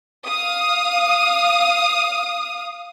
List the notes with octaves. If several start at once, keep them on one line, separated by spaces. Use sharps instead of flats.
F5 D#6